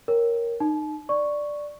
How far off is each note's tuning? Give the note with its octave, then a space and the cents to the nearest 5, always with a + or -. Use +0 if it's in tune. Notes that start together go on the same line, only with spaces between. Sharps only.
A#4 +0 C#5 +0 G5 +0
D#4 -25 A5 -40
D5 +0 C#6 +0